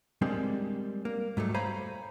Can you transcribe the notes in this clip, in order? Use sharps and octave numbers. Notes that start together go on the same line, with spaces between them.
G3 G#3 A#3 C4 D4
A#3
G#2 F#3 G3 A3
C5 C#5 F5 G#5 A#5 B5